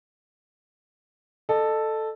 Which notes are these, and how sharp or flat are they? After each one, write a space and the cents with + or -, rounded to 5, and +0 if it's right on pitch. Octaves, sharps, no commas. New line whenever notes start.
A4 +0 D#5 -35